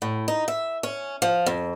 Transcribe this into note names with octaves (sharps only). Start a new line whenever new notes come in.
A2
D#4
E5
C#4
F3
F2